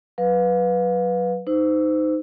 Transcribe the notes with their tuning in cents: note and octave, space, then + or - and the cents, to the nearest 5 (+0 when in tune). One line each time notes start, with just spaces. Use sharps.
F#3 +0 B4 +0 F5 +30
D#4 +0 C5 -30 E6 +0